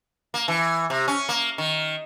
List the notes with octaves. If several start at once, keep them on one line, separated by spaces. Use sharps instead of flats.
A#3
E3
C3
C#4
A#3
D#3